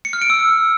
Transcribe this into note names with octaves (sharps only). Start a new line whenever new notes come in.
C#7
F6
D7
E6